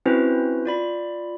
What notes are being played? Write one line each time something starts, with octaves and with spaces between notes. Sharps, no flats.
C4 C#4 E4 F#4 B4 C5
F4 D5 B5